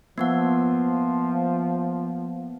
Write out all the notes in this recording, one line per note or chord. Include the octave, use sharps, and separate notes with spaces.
F3 A#3 B3 F#5